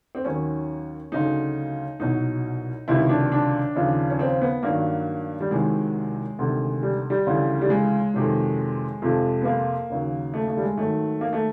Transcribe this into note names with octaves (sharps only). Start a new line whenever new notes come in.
C4
D#2 D#3 F#3 C#4
D2 C#3 F#3 D#4
C2 B2 F#3 D#4
C#2 C3 D#3 F#3 E4
D4
D4
D#2 C#3 F3
C#4
C4
B3
G2 D#3 F#3 A#3
G3
C2 C3 D#3 F#3 G#3
D2 C3 D#3
G3
G3
D2 C#3 E3
G3
G#3
F2 C3 D#3 F#3
F2 C3 F3
B3
A#3
D#2 C#3 F#3
A3
A3
G3
G#3
G#2 D#3 F#3 A3
A#3
A3